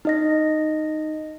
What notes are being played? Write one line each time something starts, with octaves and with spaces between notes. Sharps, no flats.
D#4 D#5 A#6